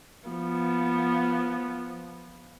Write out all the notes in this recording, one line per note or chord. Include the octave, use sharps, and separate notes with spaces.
F3 B3